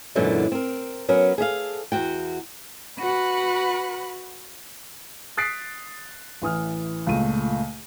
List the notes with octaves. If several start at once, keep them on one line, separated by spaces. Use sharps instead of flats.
F#2 A#2 D3 E3 F#3 G#3
C4 A#4
F#3 B3 C#4 A#4
G#4 A4 E5 F5
E2 F#4 G5
F#4 B4 F#5 B5
D#6 F#6 A6 B6 C7 D7
A1 E3 D#6 F6
C#2 A#2 A3 D#7